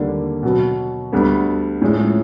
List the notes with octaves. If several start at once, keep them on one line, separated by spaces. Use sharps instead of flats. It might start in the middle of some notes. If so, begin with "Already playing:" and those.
Already playing: D#2 D3 G3 A#3 D4
B2 F#3 B3
D2 D3 G3 B3 D4
A2 F3 G#3 C#4